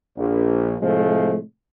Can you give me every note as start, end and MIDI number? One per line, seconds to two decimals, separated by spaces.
0.17 0.77 34
0.82 1.38 45
0.82 1.38 48
0.82 1.38 53
0.82 1.38 56
0.82 1.38 57